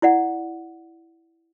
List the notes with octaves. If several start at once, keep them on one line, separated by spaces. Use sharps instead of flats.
E4 D5 F#5